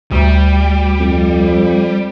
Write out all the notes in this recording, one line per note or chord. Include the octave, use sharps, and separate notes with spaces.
D2 G3
F2